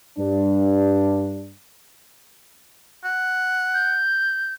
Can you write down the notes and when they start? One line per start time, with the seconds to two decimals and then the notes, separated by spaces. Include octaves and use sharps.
0.17 G2 D4
3.04 F#5
3.74 G6